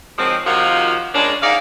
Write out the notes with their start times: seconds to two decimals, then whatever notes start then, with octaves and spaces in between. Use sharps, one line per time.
0.19 D3 D#3 F3 F#3 G#3 C4
0.47 C3 D#3 F3 A#3 F4 F#4
1.14 C#3 G#3 A#3 C#4 D4
1.43 G#2 A#3 D#4 D5 F5